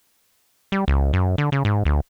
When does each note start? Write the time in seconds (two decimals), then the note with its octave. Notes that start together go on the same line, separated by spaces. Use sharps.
0.72 G3
0.88 C#2
1.13 F#2
1.38 D3
1.52 C#3
1.65 G#2
1.85 D2